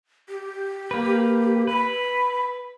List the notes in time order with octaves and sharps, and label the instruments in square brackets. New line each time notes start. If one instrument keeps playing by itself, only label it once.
[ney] G4
[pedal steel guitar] A#3 B4
[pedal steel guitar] B4 [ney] B5